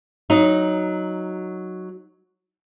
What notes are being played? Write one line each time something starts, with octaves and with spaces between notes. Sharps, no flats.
F#3 D#4